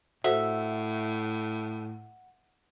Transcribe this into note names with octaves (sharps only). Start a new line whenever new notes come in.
A2 F#4 A4 C5 E5 F#5